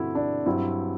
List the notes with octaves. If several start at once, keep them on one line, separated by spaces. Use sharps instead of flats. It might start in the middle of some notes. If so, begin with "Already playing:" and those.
Already playing: G2 D3 A3 C4 E4 F#4
D4
G2 F#3 C4 E4